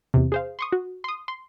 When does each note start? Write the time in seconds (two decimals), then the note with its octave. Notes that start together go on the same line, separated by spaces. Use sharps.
0.14 E2 C3
0.32 G#4 C5 F5
0.59 C6 C#6 D#6
0.72 F#4
1.04 C6 D#6
1.28 C6